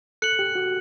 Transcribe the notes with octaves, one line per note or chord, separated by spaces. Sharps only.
A4 F#6 C#7 F#7
G4
F#4